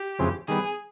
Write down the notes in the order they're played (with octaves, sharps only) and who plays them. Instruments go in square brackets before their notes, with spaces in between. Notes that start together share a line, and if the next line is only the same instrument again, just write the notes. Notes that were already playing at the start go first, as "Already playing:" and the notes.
Already playing: [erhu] G4
[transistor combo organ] F2 C#3 E3 G#3 C4
[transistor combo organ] D#3 G3 B3 [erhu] G#4